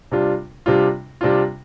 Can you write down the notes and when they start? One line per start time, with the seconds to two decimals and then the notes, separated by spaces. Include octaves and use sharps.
0.12 C3 G3 D4 F4
0.66 C3 G3 D4 F4
1.21 C3 G3 D4 F4